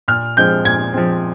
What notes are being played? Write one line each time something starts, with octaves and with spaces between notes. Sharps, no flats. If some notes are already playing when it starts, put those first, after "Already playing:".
A#2 F6
F3 G#3 C4 G6
A#2 G#6
F3 G#3 C4